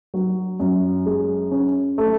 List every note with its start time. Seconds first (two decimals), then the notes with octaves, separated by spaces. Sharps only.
0.14 F#3
0.60 F#2
1.06 G#3
1.51 C#4
1.98 A3